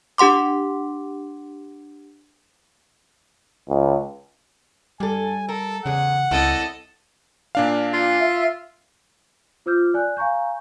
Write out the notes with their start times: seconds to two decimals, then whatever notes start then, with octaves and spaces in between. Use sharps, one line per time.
0.18 D4 G4 F#5 C6 D6
3.69 C#2
5.00 G2 G3 A4 G#5
5.49 A4 A#4
5.86 E2 C#3 G#4 F#5
6.31 C#2 G3 C4 E4 A4 D#5
7.55 A#2 D4 F5
7.93 F4
8.20 E5
9.66 F4 C5 D6 E6 F6 G6
9.94 D5 G#5 F#6
10.17 F5 G#5 A#5 C#6 G6